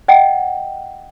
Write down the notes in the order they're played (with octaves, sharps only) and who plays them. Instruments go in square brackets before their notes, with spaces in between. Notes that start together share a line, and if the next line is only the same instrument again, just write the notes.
[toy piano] D#5 F#5 G5